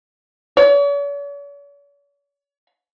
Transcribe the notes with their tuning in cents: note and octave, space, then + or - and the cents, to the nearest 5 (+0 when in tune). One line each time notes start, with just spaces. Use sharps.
C#5 +45